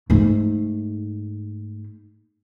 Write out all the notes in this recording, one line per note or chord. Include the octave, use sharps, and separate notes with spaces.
G#2 A3